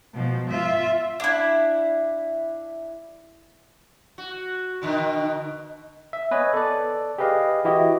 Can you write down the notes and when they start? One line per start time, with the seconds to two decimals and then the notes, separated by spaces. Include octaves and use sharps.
0.14 B2 F3
0.50 F4 E5
1.20 D4 E4
4.18 F#4
4.82 B2 D3 D#3
6.13 E5
6.31 B3 B4 C#5 D#5 G#5
6.54 A4 D5
7.18 G4 G#4 B4 D#5 F5
7.65 E3 E4 F#4 G4 D#5